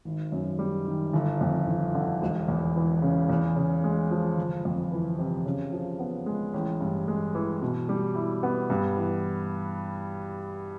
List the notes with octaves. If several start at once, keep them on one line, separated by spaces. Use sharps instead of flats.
G#1
F#2
G3
D#3
G1
F2
G1
D3
E1
E2
E3
C#3
E2
C#3
G#3
F3
G1
F2
E3
C3
C#3
F3
B3
G#3
A1
G2
G#3
E3
B2
G3
E4
B3
G2
E3